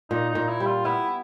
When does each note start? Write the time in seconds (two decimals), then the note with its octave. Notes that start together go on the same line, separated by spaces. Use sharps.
0.10 A#2 D#4
0.29 D#4
0.35 A#2
0.48 E4
0.60 G3
0.66 F4
0.85 B3 E4